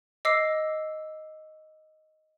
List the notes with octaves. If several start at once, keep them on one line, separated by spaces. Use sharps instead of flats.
D#5 D6 E6 C7